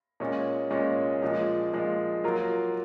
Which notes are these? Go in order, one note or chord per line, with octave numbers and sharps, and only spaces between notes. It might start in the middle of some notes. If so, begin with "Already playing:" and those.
A#2 G#3 C#4
A#2 G#3 C#4
A#2 F3 G#3
A#2 F3 G#3
F#3 A#3 F4 A#4